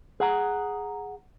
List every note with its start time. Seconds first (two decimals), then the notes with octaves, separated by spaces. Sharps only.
0.20 G#4 F#5 A#5